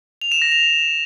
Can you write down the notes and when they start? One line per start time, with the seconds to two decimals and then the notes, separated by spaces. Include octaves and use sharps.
0.21 F7
0.32 E7
0.42 A#6
0.52 F7